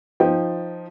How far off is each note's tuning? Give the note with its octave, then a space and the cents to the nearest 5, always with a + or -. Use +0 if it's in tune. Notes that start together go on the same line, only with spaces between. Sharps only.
F3 +0 D#4 +0 G5 +0